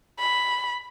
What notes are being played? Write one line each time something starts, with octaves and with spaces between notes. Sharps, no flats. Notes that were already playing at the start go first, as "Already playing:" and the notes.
B5